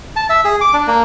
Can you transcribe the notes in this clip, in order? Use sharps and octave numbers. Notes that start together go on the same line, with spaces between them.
A5
E5
G#4
D6
D4
A#3